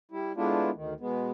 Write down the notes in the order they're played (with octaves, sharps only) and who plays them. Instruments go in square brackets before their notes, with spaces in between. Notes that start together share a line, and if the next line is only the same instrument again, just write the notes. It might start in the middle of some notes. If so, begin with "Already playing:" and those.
[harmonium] G3 E4
G#3 A3 B3 D4 E4 F4
D2 D#3
B2 G#3 B3